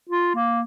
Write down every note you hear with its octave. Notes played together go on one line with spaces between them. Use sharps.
F4
A#3